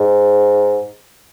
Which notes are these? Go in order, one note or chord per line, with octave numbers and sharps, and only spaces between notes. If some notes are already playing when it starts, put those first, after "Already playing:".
Already playing: G#2